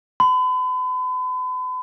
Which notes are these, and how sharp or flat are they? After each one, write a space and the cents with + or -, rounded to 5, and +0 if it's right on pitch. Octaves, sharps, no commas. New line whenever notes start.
B5 +40